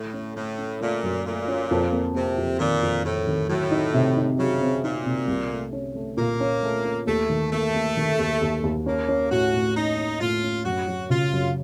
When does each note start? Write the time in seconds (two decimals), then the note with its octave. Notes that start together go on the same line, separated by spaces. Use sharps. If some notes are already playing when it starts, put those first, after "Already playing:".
Already playing: A2 A3
0.13 C#4
0.36 A2 A3
0.58 C#4
0.81 A#2 A3
1.03 F#2
1.25 A#2 A3
1.48 C#4
1.71 F2
1.92 A#3
2.14 C3 A#3
2.38 F2
2.59 A#2 D#3
2.82 F2
3.04 F2 A2
3.27 D#3
3.49 A2 F#3
3.71 D#4
3.94 C3
4.16 D#4
4.38 C#3 F#3
4.61 C4
4.84 A#2 D#4
5.06 C3
5.28 C2
5.51 A3
5.73 C#4
5.95 A3
6.17 A#2 A#3
6.40 C#4
6.62 A3
6.85 C#4
7.07 D#2 A3
7.29 D#3
7.52 A3 A#3
7.75 A#3
7.97 D#3
8.19 D#2
8.42 D#2
8.63 D#2
8.86 A#3 C#4
9.08 C#4
9.31 A2 F#4
9.53 A2
9.76 C#4 D#4
9.98 C#4
10.20 A2 F4
10.43 C#4
10.65 F#2 F#4
10.88 F#3
11.10 C#3 F4
11.33 F#2